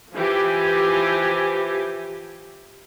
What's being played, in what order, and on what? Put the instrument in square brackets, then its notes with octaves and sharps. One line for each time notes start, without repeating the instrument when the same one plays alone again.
[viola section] E3 F3 G4 G#5